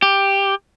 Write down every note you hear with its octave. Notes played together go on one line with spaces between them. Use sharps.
G4